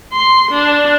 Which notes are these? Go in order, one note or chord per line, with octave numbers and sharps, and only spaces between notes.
C6
D4